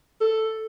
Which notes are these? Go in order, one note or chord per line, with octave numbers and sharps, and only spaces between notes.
A4